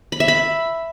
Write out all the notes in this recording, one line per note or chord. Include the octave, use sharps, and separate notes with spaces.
B5
E5
B5